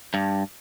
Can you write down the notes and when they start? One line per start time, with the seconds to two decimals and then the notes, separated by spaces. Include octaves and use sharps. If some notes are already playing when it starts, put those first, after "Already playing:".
0.14 G2